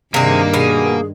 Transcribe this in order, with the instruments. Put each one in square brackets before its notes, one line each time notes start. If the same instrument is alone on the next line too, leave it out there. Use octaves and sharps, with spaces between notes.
[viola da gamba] G2 D#3 [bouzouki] C3 G#4 [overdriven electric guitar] A#3
[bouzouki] B2 G#5 [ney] G#4